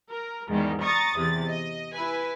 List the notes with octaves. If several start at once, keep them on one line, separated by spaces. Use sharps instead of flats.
A#4
E2 G#2 D#3 G3
A#5 C#6 D#6 A6
E2 C3 A6
D#5
E4 B4 G#5